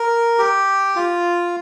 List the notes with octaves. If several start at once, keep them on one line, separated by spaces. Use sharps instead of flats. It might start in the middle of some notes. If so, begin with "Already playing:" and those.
Already playing: A#4
G4
F4